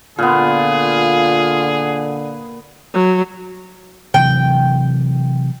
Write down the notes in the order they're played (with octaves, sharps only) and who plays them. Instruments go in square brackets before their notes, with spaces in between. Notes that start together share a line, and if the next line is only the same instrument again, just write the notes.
[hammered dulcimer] A#2 B3 [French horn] D3 [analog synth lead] F4 [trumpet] G#4
[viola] F#3
[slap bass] C3 E3 F#3 [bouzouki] G5